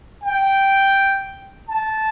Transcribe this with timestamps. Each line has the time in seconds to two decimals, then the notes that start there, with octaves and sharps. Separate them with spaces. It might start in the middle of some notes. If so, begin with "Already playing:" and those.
0.23 G5
1.68 A5